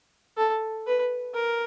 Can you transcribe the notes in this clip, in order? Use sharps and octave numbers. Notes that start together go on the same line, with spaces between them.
A4
B4
A#4